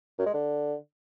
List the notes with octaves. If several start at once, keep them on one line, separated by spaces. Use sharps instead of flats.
F#2
G#3
D3